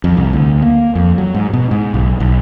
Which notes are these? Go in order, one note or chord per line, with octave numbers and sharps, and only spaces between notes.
F2
C2
D2
A#3
F2
F#3
G#2
B2
G#2
B1
B1